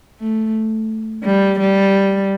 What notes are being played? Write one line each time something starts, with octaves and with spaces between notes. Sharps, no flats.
A3
G3
G3